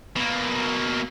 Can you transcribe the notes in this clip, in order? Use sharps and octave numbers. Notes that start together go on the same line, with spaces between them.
B2 A#3